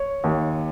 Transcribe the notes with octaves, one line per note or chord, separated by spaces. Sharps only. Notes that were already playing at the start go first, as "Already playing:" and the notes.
Already playing: C#5
D#2